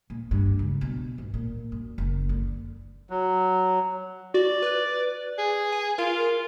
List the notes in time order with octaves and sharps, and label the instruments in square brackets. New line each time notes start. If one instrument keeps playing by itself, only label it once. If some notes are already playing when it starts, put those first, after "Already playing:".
[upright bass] A#2
G2
C#2
B2
G#1
A#2
F#2
F#1
D3
[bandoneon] F#3
[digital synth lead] F#4 [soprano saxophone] D5
[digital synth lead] B4
[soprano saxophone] G#4
[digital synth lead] G#5
[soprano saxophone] F4 [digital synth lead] A#4